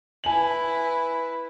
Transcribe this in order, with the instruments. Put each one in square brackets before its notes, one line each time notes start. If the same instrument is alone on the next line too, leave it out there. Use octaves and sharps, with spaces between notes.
[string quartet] E4 B4 [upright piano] G#5 F#7